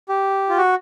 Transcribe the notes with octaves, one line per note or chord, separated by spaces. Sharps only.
G4
F4
F#4